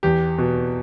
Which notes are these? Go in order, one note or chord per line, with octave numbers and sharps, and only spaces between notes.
E2 G4
B2